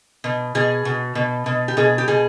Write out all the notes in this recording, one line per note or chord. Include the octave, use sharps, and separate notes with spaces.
B2
B2 G#4
B2
B2
B2
G4
B2 G#4
G4
B2 G#4